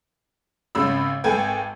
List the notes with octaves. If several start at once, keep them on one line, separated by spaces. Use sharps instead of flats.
G#1 C#3 B5 E6
G#1 A4 B4 G5 G#5 G#6